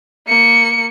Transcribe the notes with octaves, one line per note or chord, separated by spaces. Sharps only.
A#3 C#7